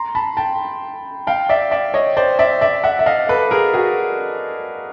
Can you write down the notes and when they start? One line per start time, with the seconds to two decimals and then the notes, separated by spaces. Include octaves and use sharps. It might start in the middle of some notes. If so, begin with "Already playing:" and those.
Already playing: A#5 C6
0.15 A5 B5
0.37 G5 A5
1.27 F5 G5
1.49 D5 E5
1.71 D5 E5
1.94 C#5 D#5
2.17 C5 D5
2.39 D5 E5
2.61 D5 E5
2.84 E5 F#5
2.99 E5
3.06 D#5 F5
3.29 A4 B4
3.51 G#4 A#4
3.74 F#4 G#4